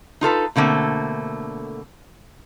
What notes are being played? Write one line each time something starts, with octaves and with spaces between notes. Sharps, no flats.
D#4 F4 A4 B4
B2 D3 A3 A#3 C4